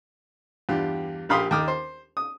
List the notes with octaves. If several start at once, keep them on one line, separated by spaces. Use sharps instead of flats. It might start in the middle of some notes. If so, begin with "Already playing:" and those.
E2 G2 F4 G4
A#1 G4 F5 B5 C6 D#6
D#2 G5 D6 D#6 F6
C5
D#6